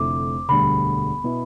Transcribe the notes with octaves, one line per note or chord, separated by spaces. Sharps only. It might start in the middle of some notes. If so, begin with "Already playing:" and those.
Already playing: F1 F2 D3 A3 E4 D6
E1 D2 D3 G3 B5
B2 B3 E4